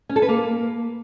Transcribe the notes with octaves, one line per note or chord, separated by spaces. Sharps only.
C#4
A4
B4
A#3